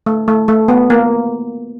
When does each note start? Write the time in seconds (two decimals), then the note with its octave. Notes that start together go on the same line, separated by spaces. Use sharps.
0.06 A3
0.28 A3
0.48 A3
0.68 B3
0.90 A#3